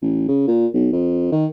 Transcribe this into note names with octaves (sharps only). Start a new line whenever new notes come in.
A1
C#3
A#2
B1
F2
D#3